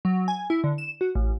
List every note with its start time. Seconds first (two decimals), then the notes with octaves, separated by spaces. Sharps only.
0.05 F#3
0.28 G#5
0.50 E4
0.64 D3
0.78 E7
1.01 F#4
1.15 A1